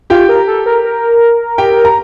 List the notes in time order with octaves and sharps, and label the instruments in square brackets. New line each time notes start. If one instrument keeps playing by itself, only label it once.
[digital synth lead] F4 [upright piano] G4 G5
[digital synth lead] A#4
A4
A#4
A#4
[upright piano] G4 G5
A#5